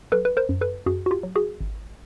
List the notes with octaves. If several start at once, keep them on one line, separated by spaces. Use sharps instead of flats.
F#3 A4 B4
B4
A#4 C5
F#2
A4 B4
F#2 F#4 G#4
F#4
F4 G4
F#3
F#4 G#4
G#1